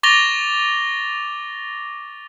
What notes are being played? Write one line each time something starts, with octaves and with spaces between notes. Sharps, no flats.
C#6 D6 A6 A#6 F7 G7